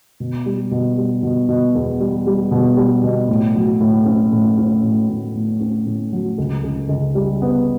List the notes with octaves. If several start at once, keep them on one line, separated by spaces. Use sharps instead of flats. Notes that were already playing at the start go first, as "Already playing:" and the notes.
B2
G3
B2
G3
B2
B2
E2
G3
G3
B2
G3
B2
A2
F#3
A2
C#4
A2
C#4
A2
A2
A2
C#4
A2
F#3
C#2
C#2
C#2
G3
B3